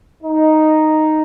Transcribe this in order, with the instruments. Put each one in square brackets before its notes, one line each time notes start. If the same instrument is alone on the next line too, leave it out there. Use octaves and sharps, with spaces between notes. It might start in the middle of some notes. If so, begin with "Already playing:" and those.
[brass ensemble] D#4